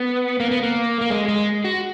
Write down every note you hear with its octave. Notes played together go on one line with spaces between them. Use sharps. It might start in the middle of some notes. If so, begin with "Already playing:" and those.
Already playing: B3
A#3
B3
A#3
A#3
G#3
G#3
F#4